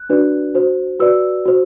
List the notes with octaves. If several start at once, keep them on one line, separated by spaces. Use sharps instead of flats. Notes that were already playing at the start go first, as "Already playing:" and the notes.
Already playing: F#6
D4 F#4 B4 D5
F#4 C5
F#4 B4 D5 E6
F#4 C5